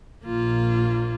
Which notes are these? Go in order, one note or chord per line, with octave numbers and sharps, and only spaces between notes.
A#1 A#2 A#3 F4